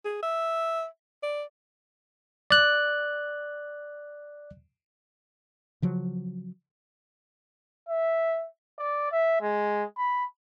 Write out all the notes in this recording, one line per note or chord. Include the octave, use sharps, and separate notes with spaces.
G#4
E5
D5
D5 F#6
C#3 F3 F#3
E5
D5
E5
G#3
B5